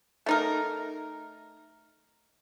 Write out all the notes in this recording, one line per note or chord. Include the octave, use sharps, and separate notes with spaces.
A3 D#4 A#4